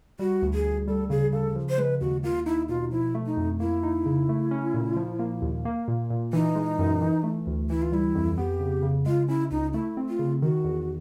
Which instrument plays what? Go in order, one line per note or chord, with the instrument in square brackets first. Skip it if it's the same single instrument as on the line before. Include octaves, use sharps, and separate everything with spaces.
[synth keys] G3 [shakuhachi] F#4
[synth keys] D2
[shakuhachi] G#4
[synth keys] D2
[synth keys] G3 [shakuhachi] A4
[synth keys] C#3 [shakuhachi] G#4
[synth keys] C#3 [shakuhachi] A4
[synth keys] F3
[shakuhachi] C5
[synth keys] G#3 [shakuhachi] B4
[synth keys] D#2 [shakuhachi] F#4
[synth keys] A#3 [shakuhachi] F4
[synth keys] D#4 [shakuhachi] E4
[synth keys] B2 [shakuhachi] F4
[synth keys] F3 [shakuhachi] E4
[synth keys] A3
[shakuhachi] D#4
[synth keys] F2
[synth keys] A#3 [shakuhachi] E4
[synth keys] D#4
C#3
A3
C#4
A#2
F3
A#3
D#2
A#3
A#2
A#2
[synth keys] E3 [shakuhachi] D#4
[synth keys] G#3
F#2
E3
A3
D2
[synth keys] E3 [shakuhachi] E4
[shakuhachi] F4
[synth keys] G3 [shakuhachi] E4
[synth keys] F2
[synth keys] B3 [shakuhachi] G4
[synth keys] C#3
C#3
[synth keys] G#3 [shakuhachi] F4
[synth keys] C#4 [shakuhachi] E4
[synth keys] C#2 [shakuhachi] D#4
[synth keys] A3 [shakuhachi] E4
[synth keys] C4
[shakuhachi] F4
[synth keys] C#3
[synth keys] D#3 [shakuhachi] F#4
[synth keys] E2